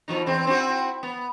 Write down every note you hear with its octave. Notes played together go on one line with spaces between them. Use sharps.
B2 F3 D#4
E2 C4
C4 E4 F#4
B3